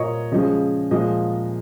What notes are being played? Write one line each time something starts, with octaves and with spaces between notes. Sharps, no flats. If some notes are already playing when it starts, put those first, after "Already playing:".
Already playing: A#2 A#3 C#5 D#5
C#3 F3 G#3 D#5
A#2 F3 G#3 D#5